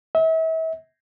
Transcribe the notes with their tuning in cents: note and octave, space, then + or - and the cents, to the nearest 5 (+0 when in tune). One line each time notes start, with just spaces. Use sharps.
E5 -35